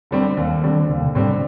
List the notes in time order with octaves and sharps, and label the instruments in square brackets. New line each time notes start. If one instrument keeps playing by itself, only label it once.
[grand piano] D3 G3 C4
[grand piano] D#2 [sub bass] D#3
[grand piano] D3 G3 C4
[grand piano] D#2 [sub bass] D3
[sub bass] C3
[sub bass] G#2 [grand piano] D3 G3 C4